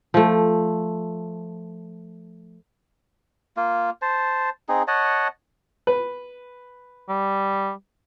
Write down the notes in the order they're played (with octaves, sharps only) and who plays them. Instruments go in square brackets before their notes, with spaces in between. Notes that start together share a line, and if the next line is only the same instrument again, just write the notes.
[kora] F3 A3
[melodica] A#3 F4
C5 A5
C4 D#4 G#4
C#5 D#5 F#5 A5
[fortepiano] B4
[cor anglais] G3